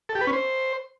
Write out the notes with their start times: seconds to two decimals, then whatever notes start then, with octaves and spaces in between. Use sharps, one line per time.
0.09 A4
0.15 G4
0.21 B4
0.27 C#4
0.33 C5